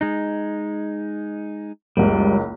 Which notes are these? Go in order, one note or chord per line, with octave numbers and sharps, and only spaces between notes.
G#3 D#4
F#1 C#2 G3